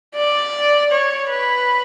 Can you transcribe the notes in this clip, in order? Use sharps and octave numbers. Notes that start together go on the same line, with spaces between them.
D5
C#5
B4